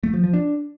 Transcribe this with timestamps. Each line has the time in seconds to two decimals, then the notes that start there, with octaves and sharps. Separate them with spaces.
0.03 A3
0.13 F3
0.24 F3
0.34 D4